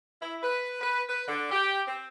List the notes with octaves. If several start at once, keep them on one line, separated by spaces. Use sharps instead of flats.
E4
B4
B4
B4
D3
G4
C4